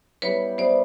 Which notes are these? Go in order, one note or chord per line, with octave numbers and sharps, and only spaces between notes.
G3 B3 E4 B4 C#5
G3 B3 E4 C5 D5